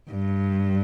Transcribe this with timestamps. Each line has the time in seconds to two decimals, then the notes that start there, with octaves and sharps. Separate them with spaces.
0.11 G2